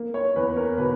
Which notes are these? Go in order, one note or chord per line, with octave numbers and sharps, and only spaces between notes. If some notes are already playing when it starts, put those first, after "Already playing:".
Already playing: A#3
C#5
E2 B4
A#4
B2 B4